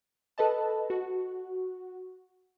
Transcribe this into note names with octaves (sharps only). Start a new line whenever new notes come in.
A4 B4 D#5 A5
F#4